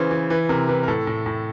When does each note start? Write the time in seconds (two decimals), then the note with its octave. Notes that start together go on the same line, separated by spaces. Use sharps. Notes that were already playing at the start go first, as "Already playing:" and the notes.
Already playing: C#3 E3 C5
0.11 E3
0.30 E3 B4
0.49 C3 A#4
0.69 E3 B4
0.83 A#4
0.88 A2 A4
1.07 A2
1.26 A2